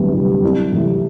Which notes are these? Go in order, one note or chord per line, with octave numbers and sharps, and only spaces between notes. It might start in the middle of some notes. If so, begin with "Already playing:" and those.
Already playing: D2 C3 F#3 G3 B3
C3 G3 B3
C2
C3 E3 A3